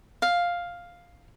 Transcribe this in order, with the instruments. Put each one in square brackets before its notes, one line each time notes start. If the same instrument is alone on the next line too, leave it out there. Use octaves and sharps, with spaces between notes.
[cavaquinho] F5